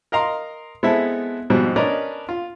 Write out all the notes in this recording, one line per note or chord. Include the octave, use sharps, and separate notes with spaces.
A#4 D#5 F5 A#5 C6
G#3 B3 C4 E4 A4 E5
G#2 B2 F3 G3 C4
C#4 D4 A#4 B4 D5 D#5
F4